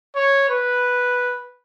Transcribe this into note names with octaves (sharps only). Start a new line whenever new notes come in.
C#5
B4